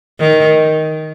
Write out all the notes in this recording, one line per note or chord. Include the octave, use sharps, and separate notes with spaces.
D#3